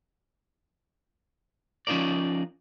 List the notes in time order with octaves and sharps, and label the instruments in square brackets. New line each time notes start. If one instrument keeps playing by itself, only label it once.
[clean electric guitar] F3 C#4 D#4 F4 A#4 D5